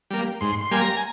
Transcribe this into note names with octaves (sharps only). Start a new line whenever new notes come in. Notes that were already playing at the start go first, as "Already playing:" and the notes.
G3 A#3
G#2 C6
C6
G3 A#3 G#5
A#5
G#5